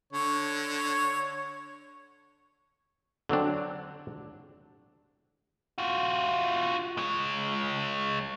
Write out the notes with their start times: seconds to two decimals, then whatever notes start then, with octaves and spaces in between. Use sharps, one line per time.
0.13 D3 C#5
3.29 D3 F#3 C4 D4
5.78 F4 F#4
6.97 G#3 C#5